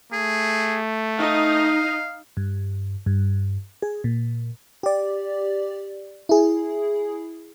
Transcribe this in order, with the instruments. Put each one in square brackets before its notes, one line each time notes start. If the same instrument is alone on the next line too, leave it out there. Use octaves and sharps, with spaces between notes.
[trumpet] A3 [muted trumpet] G#4
[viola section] D#4 [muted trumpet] F5
[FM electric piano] G2
G2
G#4
A#2
G4 D5
E4 G#4